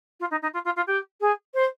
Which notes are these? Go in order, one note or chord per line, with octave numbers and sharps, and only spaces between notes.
F4
D#4
D#4
F4
F4
F4
G4
G#4
C5